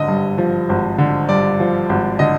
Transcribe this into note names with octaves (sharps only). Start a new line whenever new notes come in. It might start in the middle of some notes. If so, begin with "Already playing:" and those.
Already playing: G#1 D3 D#5
G2
F3
G#1
D3
G2 D5
F3
G#1
D3 D#5